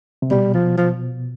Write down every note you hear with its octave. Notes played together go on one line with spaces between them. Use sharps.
C3
B2 G3
F3
F3